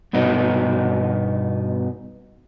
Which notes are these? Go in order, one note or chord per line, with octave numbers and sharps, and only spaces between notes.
G2 B2 B3 D#4